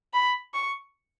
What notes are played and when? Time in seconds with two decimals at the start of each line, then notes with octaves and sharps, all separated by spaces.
0.13 B5
0.54 C#6